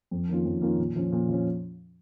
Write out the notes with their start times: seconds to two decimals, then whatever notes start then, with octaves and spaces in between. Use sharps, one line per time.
0.11 F2
0.29 D#3 A#3 C#4 F4
0.45 F2
0.62 D#3 A#3 C#4 F4
0.78 A#2
0.96 F3 C#4
1.12 A#2
1.29 F3 C#4